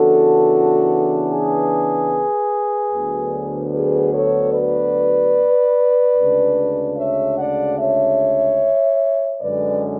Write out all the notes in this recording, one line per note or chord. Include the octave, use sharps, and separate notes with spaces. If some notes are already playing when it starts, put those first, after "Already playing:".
Already playing: C#3 E3 B3 D4 F#4 A4
G#4 B4
D2 D3 F#3 B3
G#4 B4
A4 C#5
B4 D5
D2 C#3 G#3 D4
C#5 E5
D5 F#5
C#5 E5
F#2 D3 G#3 C#4 B4 D5